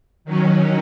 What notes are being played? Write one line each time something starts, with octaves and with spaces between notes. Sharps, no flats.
D#3 F#3 C#4